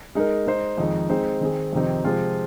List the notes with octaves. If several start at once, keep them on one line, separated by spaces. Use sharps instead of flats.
G#3 D#4 A#4
G#3 D#4 C5
F2 D#3 G#3 D#4
G#3 C4 D#4 C5
D#3 C4 G#4
F2 C3 D#3 C4 D#4
C3 F3 G#3 C4 F4